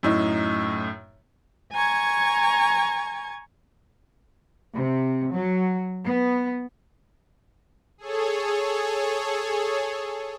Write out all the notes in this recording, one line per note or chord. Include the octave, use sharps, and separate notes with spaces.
F#2 A2 D#4
G#5 A#5 C#6 G#6
C3
F#3
B3
G#4 A4 C#5